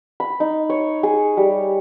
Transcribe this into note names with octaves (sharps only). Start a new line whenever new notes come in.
B5
D#4
C#5
G#4
G3